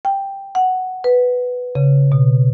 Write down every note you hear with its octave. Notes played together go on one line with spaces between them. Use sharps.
G5
F#5
B4
C#3
B2